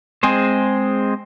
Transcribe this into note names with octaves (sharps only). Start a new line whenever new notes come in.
G#3 C4 G#4 C5